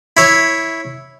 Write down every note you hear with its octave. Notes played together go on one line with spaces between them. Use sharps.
E4 C#5